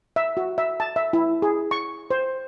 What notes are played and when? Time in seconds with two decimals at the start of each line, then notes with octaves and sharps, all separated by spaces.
0.16 E5
0.37 F#4
0.58 E5
0.80 A5
0.96 E5
1.13 E4
1.42 G#4
1.71 C#6
2.11 C5